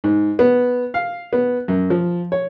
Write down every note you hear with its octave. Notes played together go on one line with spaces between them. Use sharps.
G#2
B3
F5
B3
F#2
F3
C#5